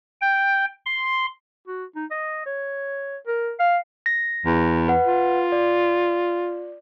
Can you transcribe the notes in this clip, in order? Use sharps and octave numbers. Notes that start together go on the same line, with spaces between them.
G5
C6
F#4
D#4
D#5
C#5
A#4
F5
A#6
E2
B4 F#5
F4
D5